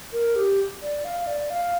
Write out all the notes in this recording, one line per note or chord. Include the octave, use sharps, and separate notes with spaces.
A#4
G4
D5
F5
F5
D5
F5